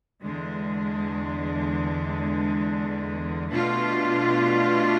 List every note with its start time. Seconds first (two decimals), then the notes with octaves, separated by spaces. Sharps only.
0.23 E2 D3 G#3
3.50 B2 A3 D4 F4